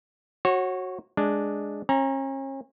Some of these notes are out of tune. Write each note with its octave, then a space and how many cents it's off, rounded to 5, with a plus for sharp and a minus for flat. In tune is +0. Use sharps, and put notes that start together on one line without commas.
F#4 +0 C#5 -30
G#3 +0 D4 +0
C#4 -40 A#5 +0